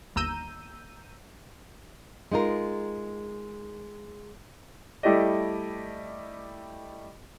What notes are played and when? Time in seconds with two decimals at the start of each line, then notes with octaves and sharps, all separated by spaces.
0.16 G1 D#2 A#5 E6 G6 D#7
2.32 G#3 D#4 F4 A#4
5.03 G3 A3 E4 G4 D5 D#5